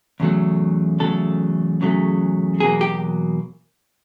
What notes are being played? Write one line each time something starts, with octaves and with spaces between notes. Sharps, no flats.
E2 C#3 F#3 A3
E2 C#3 F#3 A3 A4
E2 C#3 F#3 A3
E2 B2 F#3 A#3 G#4
G4